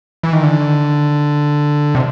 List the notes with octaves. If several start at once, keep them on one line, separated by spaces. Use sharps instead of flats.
E3
D#3
D3
C3